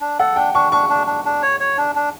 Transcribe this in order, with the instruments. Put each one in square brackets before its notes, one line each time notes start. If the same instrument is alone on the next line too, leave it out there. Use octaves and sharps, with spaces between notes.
[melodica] D4
[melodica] A4 [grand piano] F#5
[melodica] D4 [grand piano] G5
[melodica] D4 [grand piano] C#6
[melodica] D4 [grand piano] C#6
[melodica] D4
D4
D4
C#5
C#5
D4
D4